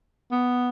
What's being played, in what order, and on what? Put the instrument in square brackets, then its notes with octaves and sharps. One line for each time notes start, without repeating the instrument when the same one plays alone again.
[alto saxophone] B3